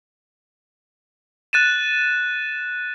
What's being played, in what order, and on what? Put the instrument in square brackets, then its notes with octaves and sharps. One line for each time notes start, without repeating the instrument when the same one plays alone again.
[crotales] F#6 A6 D#7 E7